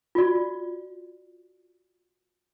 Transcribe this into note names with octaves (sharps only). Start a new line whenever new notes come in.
F4 F#4 D5